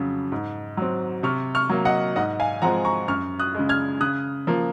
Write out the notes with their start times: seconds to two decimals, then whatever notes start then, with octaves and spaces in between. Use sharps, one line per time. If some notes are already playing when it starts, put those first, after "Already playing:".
Already playing: F2 C#3 F#3
0.32 G#2
0.77 F#3 C4
1.23 C3 C#6 F6
1.55 C#6 F6
1.70 F#3 A#3
1.85 D#5 F#5
2.16 G#2 D#5 F#5
2.40 F5 G#5
2.62 F3 G#3 C4 F#5 A#5
2.85 A#5 C#6
3.08 F#2 C#6 F6
3.39 D#6 F#6
3.55 C#3 G#3
3.69 F6 G#6
4.01 C#3 D#6 F#6
4.47 F3 A#3